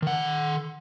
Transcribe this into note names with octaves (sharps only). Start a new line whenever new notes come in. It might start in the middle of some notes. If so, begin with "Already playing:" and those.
D#3 F#5